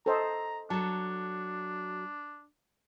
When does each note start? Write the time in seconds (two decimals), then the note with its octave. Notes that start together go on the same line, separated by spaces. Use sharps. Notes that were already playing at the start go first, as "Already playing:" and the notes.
0.06 A4 C5 D#5 A#5
0.70 F#3 D4 A4 A5